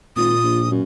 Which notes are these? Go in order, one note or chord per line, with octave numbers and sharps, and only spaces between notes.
G#1 A#2 F4 D#6
A#1
F#2